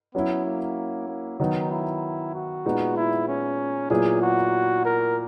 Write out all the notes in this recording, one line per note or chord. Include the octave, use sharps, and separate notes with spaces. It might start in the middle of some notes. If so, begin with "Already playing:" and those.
F#3 B3 C#4 E4
A#3
A#3
D#3 F#3 B3 D#4
E4
F#4
A#2 G#3 B3 D#4
E4
C#4
A#2 F#3 B3 E4 G#4
F#4
A#4